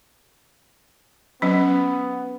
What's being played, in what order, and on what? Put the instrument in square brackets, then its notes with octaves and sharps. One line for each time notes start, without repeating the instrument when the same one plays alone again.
[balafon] F#3 C#4 [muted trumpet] B3